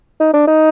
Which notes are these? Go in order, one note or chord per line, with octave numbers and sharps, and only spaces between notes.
D#4
D4
D#4